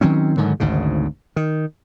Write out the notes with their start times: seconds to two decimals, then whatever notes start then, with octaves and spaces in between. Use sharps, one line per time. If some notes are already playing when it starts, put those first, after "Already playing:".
0.01 D#3 F#3 C4 C#4
0.37 G#2 D3 D#3 F#3
0.60 G#1 D2 G#2 C#3
1.36 D#3